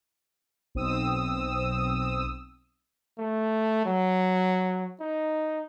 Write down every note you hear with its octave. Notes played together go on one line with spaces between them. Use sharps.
B1 C4 D#6 E6
A3
F#3
D#4